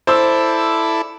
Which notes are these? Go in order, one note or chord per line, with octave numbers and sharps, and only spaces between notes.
E4 A4 C5 D5 E6